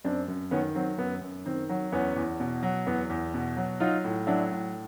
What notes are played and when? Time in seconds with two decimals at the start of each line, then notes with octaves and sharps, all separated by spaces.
0.05 F#2 C4 D4
0.28 F#2
0.51 D#3 B3 C#4
0.75 F#3 C4
0.98 F#2 B3
1.21 F#2
1.46 D#3 C4
1.69 F#3
1.92 E2 B3 C#4
2.16 E2
2.40 B2
2.63 F#3
2.87 E2 B3
3.10 E2
3.34 B2
3.57 F#3
3.80 F#3 D#4 F4
4.04 A2
4.27 F#3 D4 E4
4.51 A2